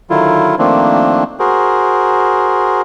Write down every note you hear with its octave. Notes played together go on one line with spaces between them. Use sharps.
D3 D#3 F#3 E4 F4
D#3 F3 A3 A#3 C4 D4
F#4 G#4 A#4 C5